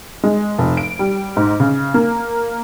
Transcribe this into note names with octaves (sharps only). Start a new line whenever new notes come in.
G#3
F1
D7
G3
G#2
C#3
A#3